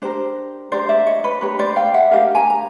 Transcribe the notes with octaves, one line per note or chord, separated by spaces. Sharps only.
D4 G4 A#4 C5
D4 G4 A#4 C5 D5
D5 E5
C#5 D#5
B4 C#5
D4 G4 A#4 B4 C#5
C5 D5
F5 G5
E5 F#5
D4 G4 A#4 D#5 F5
G#5 A#5
A#5